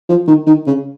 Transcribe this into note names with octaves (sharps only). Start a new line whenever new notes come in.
F3
D#3
D#3
C#3